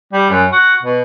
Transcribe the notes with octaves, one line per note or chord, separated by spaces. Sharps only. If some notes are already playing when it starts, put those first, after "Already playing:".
G3
F#2
F#4
B2